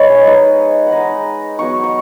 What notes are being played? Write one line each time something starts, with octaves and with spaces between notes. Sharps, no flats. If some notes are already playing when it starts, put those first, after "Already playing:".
Already playing: G#3 D#4 B4 C#5 D#5
G#4
G#3 D#4 B4
F#5
G#3 D#4 D#5
F#3 B3 D#4 C#6
C#6